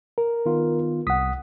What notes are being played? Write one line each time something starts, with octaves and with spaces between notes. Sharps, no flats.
A#4
D#3 B3 F4
C2 F#5 D#6 B6